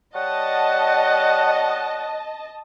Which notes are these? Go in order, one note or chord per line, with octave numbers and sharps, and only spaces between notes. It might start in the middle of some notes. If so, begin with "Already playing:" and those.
G3 C#5 D#5 F#5 A5